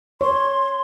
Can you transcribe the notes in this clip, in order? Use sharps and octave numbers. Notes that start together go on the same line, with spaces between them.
C#5 C6